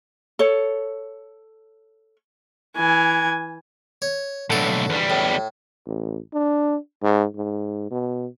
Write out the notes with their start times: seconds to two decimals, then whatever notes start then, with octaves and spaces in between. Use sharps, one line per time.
0.39 A4 C#5
2.77 E3 G#5
4.02 C#5
4.50 B1 A2 D3 A4
4.90 E2 G3
5.10 A2
5.86 A1
6.34 D4
7.03 G#2
7.36 G#2
7.91 B2